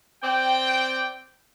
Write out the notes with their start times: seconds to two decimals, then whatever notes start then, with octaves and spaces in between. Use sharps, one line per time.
0.22 C4 D5 G5